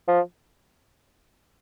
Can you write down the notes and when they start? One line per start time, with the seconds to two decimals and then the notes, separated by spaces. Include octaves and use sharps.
0.08 F3